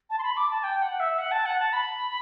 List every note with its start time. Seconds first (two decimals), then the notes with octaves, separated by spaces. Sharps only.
0.10 A5
0.19 C6
0.23 B5
0.37 D6
0.51 A5
0.63 G5
0.82 F#5
1.00 E5
1.18 F#5
1.31 A5
1.45 F#5
1.59 A5
1.73 B5